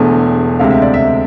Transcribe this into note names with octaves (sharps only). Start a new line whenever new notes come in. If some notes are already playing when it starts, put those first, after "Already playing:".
Already playing: E1 E2 D3 A3 G#5
D2 C3 G#3 C4 F5
E5
D5
E5